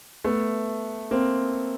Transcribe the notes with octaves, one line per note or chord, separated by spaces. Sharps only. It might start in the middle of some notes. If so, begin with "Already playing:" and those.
A3 B3
A#3 C4